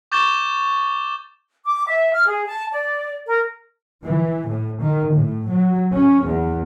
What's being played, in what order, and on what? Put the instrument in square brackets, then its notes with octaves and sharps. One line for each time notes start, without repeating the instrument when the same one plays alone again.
[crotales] C#6 D6 G6 A6 E7 G7
[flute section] D6
E5
F6
G#4
A5
D5
A#4
[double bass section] E3
A2
D#3
A2
F#3
C#4
E2